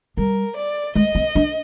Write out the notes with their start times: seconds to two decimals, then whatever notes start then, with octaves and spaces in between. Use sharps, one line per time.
0.17 G3 A#4
0.56 D5
0.95 G#3 D#5
1.15 C4
1.35 D4